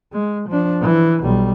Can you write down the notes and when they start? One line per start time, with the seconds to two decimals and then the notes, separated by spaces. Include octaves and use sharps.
0.12 G#3
0.49 F3 D4
0.82 E3
1.22 B1 G3